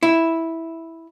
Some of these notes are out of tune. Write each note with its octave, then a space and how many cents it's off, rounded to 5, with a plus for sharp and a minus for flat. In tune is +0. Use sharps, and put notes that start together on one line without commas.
E4 -5